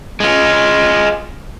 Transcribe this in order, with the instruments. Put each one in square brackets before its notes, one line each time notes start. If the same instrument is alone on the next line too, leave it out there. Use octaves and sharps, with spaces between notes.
[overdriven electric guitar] G#3 F4